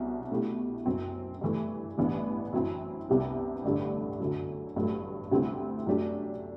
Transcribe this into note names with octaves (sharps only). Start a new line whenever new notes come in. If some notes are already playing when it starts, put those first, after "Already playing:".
Already playing: C2 B2 F#3
B2 A3 E4 G4
F#1 F#2 F#3 C4
G2 E3 A3
A1 G2 E3 B3 D4
F#2 F#3 C4 E4
C2 C3 G3 B3
A1 G2 D3 G3 D4
F#2 D3 F#3
A1 G2 F#3 A3
D2 C3 G3 C4 E4
F#2 F#3 A3 D4 G4